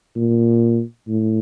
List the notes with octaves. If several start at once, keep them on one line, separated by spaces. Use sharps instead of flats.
A#2
A2